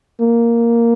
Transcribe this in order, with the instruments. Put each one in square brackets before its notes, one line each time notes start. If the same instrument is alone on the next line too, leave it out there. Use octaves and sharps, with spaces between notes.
[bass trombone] A#3